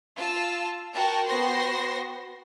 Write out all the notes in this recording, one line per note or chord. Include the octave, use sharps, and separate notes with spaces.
F4 A5 E6
F#4 A#4 G5 A5
B3 F#4 C5 G5 C6 A#6